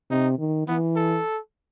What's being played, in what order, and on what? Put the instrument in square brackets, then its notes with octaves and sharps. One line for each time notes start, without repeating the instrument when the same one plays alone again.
[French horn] C3 [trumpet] D#4
[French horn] D#3
[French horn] E3 [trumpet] B3
[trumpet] A4